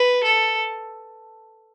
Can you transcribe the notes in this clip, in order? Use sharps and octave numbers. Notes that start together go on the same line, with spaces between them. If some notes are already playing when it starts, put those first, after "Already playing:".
Already playing: B4
A4